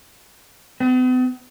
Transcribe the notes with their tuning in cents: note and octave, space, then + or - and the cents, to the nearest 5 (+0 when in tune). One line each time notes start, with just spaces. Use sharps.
B3 +45